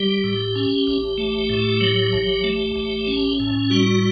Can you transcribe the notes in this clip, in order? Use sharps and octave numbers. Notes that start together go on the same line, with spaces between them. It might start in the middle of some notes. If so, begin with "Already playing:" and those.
Already playing: G3 G4
A2
C#4
A1
A3
A2
F#3
A1
A3
A1
C#4
A2
G3 F#4